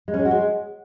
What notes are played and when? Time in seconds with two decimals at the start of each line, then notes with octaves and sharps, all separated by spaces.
0.08 G#3
0.14 C#4
0.19 G#3
0.25 F#4
0.31 G#3